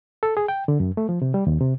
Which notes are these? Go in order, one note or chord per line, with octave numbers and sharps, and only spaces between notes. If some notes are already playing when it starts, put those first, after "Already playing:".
A4
G#4
G5
D3
F#2
A3
F3
C3
G3
D#2
C3